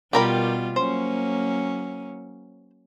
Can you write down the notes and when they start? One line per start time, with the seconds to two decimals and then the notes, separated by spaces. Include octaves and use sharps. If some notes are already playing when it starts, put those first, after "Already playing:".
0.13 B2 G3 F4 G4 A#4 B5
0.76 F#3 A#3 C#4 C5